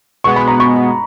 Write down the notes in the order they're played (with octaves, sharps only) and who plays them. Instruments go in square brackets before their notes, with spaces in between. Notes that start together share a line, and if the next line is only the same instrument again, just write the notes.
[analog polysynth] B2 G#3 B3 [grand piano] C#6
[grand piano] B5
A#5
C#6